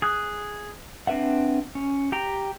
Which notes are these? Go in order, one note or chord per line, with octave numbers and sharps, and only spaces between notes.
G#4 D#6 F#6
C4 D4 B4 E5 F#5
C#4
G4 G5 A#5